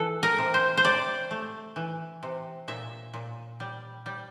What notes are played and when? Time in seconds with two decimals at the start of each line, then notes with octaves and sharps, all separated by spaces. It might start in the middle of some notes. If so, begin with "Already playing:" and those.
Already playing: E3 A4
0.23 A#4
0.38 C3
0.54 C5
0.77 C5
0.84 C3 D5
1.31 A3
1.76 E3
2.23 C3
2.68 A#2 E5
3.14 A#2
3.60 G3
4.06 G3